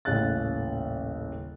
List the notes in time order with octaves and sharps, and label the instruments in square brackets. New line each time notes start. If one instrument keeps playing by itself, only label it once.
[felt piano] D#1 A1 C#3 F#6 A6